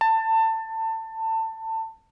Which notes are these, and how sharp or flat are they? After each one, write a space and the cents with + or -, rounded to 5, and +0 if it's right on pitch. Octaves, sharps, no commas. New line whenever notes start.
A5 +25